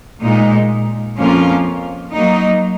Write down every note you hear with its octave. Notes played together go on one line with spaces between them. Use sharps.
A#2 G#3 D#4
F2 F3 A#3 C#4 F4
F#3 A#3 D#4